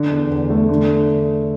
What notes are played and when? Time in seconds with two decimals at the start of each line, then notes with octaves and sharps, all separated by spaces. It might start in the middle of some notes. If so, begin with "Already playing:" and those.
Already playing: D3
0.11 E2
0.30 E2
0.50 A3
0.69 D3